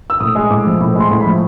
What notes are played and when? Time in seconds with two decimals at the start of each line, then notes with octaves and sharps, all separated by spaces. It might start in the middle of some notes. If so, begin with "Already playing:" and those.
0.10 E6
0.20 A2 D#6
0.35 G#3
0.50 A2 D6
0.66 F3
0.81 A2
0.95 G#3
1.00 C6
1.10 A2
1.20 B5
1.26 F3